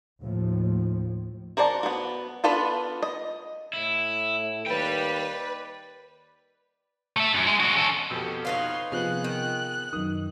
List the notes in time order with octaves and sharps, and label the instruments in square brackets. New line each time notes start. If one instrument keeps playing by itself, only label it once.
[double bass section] D#2 A2 F3
[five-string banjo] F#4 A#4 C5 D5 A5
B3 F#4
B3 D4 F4 A4 B4
D#5
[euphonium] A2 [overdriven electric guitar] E4
[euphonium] D#2 [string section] B4 [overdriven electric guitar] D5 G5
[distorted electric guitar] A3 E5
F#2
G#3
G#3 F#4
C#4 A4
[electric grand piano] F2 B2 E6 [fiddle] G4 A4
[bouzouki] D#4 B4 F5 [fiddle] C#5 C6
[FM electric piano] C3 F3 [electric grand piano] B3 G#4 [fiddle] F#6
[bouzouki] D#3
[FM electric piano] F#2 D#3 [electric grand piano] D#6